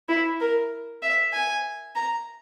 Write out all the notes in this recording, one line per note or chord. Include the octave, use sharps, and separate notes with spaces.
E4
A#4
E5
G#5
A#5